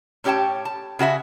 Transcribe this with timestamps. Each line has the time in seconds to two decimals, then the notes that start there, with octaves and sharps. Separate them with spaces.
0.24 A2 C#4 G4 C#5 G5 A5
0.65 A5
0.99 C#3 F#4 A4 E5